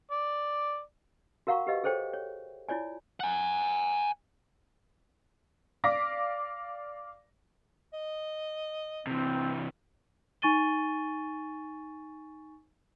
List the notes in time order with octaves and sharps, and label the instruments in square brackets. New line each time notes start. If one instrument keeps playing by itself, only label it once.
[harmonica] D5
[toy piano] F#4 A#4 F5 F#5 A#5 C#6
G4 B4 D#5 F5
G#4 A4 C5 C#5 G5
C#5
E4 F4 C#5 D5 G#5
[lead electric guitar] F#5 G#5
[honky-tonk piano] D5 F5 D6 A#6 B6
[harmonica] D#5
[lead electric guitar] C3 E3 [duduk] C4
[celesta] D#4 G#5 C#6 A6 D#7 G7